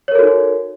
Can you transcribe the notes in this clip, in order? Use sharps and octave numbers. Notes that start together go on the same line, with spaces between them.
D#4 F#4 A4 A#4 C#5